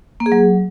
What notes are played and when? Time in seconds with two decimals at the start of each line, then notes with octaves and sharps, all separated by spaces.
0.20 A#3
0.26 G#4
0.32 F#3